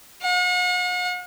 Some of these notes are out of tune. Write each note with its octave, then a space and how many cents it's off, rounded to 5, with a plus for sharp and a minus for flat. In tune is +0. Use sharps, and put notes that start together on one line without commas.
F#5 -45